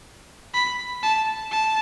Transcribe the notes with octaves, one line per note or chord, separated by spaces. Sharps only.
B5
A5
A5